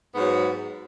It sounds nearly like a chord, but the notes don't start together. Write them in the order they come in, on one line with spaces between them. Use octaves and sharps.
B3 G#2 F#3